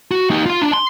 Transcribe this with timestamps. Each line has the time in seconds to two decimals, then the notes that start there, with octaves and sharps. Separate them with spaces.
0.11 F#4
0.30 D#4 G4
0.46 F4 C6
0.62 D4
0.74 C6